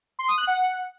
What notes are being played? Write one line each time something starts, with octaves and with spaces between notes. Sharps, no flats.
C6
D#6
F#6
F#5